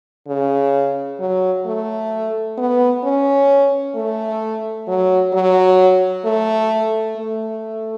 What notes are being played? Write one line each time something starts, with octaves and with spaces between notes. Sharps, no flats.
C#3
F#3
A3
B3
C#4
A3
F#3
F#3
A3
A3